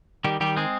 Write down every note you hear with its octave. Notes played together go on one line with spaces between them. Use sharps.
D#3 G3 G4
D#3 G3 G4
G#3 C4 G#4